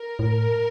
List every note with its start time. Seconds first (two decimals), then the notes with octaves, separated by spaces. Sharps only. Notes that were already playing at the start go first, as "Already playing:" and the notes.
Already playing: A#4
0.19 A2